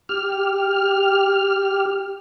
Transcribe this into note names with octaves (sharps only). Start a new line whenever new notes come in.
G4 F6